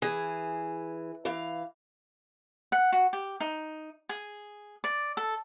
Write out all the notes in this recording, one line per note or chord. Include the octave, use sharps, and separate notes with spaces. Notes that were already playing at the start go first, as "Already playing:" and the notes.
E3 G#4
E3 F5
F#5
F#4
G4
D#4
G#4
D5
A4